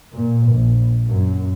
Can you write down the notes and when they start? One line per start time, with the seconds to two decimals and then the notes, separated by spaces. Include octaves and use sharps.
0.14 A#2
0.49 A#1
1.06 F#2